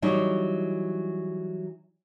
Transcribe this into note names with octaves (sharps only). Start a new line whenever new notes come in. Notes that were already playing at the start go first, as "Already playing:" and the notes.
E3 F#3 G3 D#4